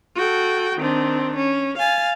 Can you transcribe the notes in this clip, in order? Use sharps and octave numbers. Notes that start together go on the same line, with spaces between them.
F#4 A4 G5
D#3 C4 D4
C#4
F5 G#5 A6